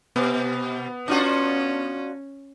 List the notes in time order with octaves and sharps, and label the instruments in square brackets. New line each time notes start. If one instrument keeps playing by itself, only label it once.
[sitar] B2 [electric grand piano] B3
[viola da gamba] C#4 [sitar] D4 F4 F#4